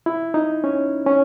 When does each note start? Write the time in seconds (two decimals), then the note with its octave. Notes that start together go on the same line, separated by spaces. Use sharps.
0.06 E4
0.34 D#4
0.64 C#4
1.06 C#4